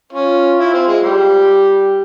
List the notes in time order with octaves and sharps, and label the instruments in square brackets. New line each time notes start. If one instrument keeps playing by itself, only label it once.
[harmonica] C#4 [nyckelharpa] F4
[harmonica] E4
C4
G#3
[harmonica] G3 [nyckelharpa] G4